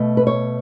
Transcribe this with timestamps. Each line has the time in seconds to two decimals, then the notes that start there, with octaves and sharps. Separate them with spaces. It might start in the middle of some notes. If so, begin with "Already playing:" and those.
Already playing: B2 A3
0.17 B4
0.27 C#5